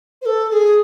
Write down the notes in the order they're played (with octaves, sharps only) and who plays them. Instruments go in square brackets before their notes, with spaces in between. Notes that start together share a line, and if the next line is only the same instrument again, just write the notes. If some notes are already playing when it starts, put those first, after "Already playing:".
[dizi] C5
A4
A4
G#4